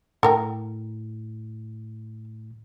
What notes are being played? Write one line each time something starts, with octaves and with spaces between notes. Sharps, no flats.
A2 A4 A#4 G5